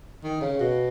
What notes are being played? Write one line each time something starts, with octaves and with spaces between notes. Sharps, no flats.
D#3
C#3
B2